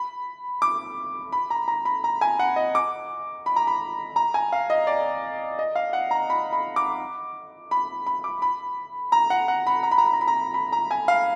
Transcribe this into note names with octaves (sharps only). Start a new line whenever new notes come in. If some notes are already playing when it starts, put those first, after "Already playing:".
Already playing: B5
D6
B5
A#5
A#5
B5
A#5
G#5
F#5
D#5
D6
B5
A#5
B5
A#5
G#5
F5
D#5
D5
D#5
F5
F#5
A#5
B5
B5
D6
B5
B5
D6
B5
A#5
F#5
F#5
B5
A#5
B5
A#5
B5
A#5
B5
A#5
B5
A#5
G#5
F5